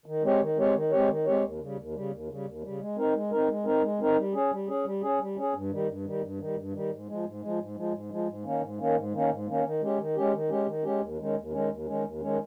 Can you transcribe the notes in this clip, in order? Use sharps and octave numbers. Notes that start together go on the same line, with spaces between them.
D#3
G#3 C4 G4 C#5
D#3
G#3 C4 G4 C#5
D#3
G#3 C4 G4 C#5
D#3
G#3 C4 G4 C#5
D#2
C#3 G3
D#2
C#3 G3
D#2
C#3 G3
D#2
C#3 G3
G#3
C4 D#4 A#4
G#3
C4 D#4 A#4
G#3
C4 D#4 A#4
G#3
C4 D#4 A#4
G3
C#4 G#4
G3
C#4 G#4
G3
C#4 G#4
G3
C#4 G#4
G2
D#3 G3
G2
D#3 G3
G2
D#3 G3
G2
D#3 G3
G#2
F3 G#3
G#2
F3 G#3
G#2
F3 G#3
G#2
F3 G#3
G#2
D#3 A#3 C#4
G#2
D#3 A#3 C#4
G#2
D#3 A#3 C#4
G#2
D#3 A#3 C#4
D#3
G#3 C#4 G4
D#3
G#3 C#4 G4
D#3
G#3 C#4 G4
D#3
G#3 C#4 G4
D#2
D#3 G#3 C#4
D#2
D#3 G#3 C#4
D#2
D#3 G#3 C#4
D#2
D#3 G#3 C#4